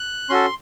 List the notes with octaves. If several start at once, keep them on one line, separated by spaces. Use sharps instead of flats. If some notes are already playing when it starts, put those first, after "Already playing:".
Already playing: F#6
C#4 F#4 A4 C6